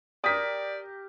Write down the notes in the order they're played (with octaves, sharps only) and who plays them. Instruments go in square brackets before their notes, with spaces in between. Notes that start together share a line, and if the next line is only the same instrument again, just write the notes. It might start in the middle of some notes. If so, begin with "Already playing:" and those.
[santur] G4 A#4 [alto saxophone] D5 [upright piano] D#6 B6